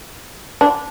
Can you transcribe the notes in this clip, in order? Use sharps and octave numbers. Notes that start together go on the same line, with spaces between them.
D4